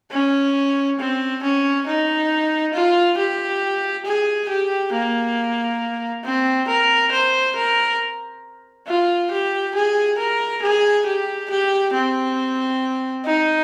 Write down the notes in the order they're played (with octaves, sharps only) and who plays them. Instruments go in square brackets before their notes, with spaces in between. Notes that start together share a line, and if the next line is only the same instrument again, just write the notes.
[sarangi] C#4
C4
C#4
D#4
F4
G4
G#4
G4
A#3
C4
A#4
C5
A#4
F4
G4
G#4
A#4
G#4
G4
G4
C4
D#4